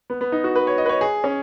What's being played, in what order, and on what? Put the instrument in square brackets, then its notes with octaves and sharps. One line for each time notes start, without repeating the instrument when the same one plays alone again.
[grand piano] B3
B3
D#4
F#4
B4
C#5
D#5
B4
C#5
G#4
C#4